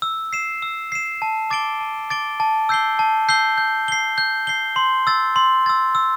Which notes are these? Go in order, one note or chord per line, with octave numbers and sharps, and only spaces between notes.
E6
C7 E7
E6
C7 E7
A5
D6 A6 D7 G7
A5
D6 A6 D7 G7
A5
E6 G6 C7 G7
A5
E6 G6 C7 G7
G6
C7 G7
G6
C7 G7
C6
E6 A6
C6
E6 A6
E6